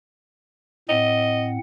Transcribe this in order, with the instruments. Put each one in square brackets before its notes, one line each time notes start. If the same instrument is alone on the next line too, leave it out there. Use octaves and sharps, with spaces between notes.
[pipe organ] A2 C4 F#5 [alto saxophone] D#5